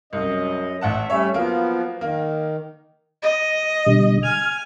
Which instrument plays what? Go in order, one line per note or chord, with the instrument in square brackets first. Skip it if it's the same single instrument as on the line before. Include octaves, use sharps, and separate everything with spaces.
[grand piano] C2 [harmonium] F#2 D#5
[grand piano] A1 F#5 A5 [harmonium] E5
[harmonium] G3 A3 C#4 [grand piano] C#5 E5
[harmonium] F3 B3 [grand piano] F#3 A#3
[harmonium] D#3 [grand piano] A#3
[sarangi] D#5
[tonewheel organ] B2 D3 G3
[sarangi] G#5 [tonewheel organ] F6